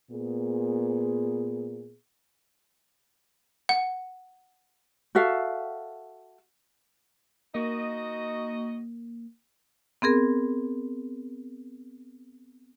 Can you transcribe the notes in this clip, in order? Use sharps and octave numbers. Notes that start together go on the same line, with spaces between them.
A#2 B3 G#4
F#5
F#4 A4 E5 F5
A#3 D#4 F#4 D#5
B3 C4 G#4 A#4